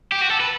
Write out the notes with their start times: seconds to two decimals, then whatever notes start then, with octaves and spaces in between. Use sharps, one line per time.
0.12 G4
0.21 F#4
0.31 A4
0.40 B4